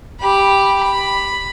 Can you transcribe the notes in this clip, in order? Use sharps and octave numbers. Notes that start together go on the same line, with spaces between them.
G4 B5
B5